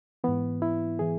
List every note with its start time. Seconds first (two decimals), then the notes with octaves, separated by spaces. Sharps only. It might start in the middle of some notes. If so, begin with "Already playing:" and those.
0.24 G#2 E3 B3
0.62 E4
0.99 E3 G#4